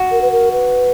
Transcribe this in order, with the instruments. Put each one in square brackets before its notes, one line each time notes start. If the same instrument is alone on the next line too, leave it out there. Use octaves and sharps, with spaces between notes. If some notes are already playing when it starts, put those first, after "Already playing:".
Already playing: [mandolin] F#4
[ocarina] A#4
B4
A#4
B4